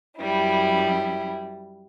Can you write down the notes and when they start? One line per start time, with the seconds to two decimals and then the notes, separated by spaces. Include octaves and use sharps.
0.20 F#2 G3 E4